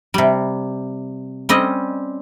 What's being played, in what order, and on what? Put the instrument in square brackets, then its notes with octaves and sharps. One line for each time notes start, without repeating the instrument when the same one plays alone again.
[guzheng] C3 G3
G3 C4 C#4 D#5